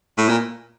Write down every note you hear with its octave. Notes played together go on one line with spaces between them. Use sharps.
A2
A#2